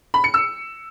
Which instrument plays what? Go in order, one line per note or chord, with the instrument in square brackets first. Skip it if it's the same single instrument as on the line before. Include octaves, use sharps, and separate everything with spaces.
[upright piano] B5
C#7
E6